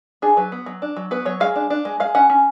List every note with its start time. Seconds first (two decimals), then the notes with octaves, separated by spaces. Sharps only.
0.22 D4 G#4
0.37 F#3 B4
0.52 B3
0.66 F#3
0.82 D4
0.97 F#3
1.11 B3 B4
1.25 F#3 C#5
1.40 G#3 F5
1.55 D4
1.70 D4
1.85 G#3
2.00 G#3 F5
2.15 C#4 F#5
2.30 C#4